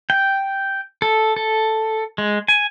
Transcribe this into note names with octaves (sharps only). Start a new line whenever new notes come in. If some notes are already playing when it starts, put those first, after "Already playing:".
G5
A4
A4
G#3
G#5